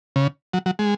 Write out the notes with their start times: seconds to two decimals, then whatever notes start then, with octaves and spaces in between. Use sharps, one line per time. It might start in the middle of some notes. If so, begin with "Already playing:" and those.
0.16 C#3
0.53 F#3
0.66 F#3
0.79 G#3